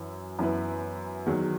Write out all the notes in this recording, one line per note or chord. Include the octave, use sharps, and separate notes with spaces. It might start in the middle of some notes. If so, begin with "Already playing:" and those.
Already playing: F#2 E3 E4
F#2 E3 B3 E4 B4
E2 D#3 F#3